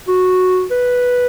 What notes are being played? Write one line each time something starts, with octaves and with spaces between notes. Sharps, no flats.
F#4
B4